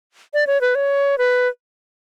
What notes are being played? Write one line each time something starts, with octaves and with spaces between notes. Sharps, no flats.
D5
C#5
B4
C#5
B4